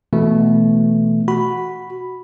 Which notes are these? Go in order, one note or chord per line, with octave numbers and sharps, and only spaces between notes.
B2 E3 A3
F#4 B5